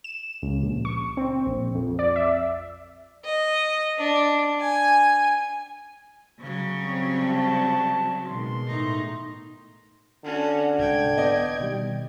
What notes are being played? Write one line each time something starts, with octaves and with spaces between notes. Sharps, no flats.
E7
C#2
A#1
C#6
C4
A#1
F2
D5
E5
D#5
D4
G#5
C#3 F#3
G3 C4
A5
B2 D#3 G#3 C6
A2 D#4
D3 C#4 F#4
C2 G#2 G5 G#6
B3 D5 D#5
B2 D#3 G3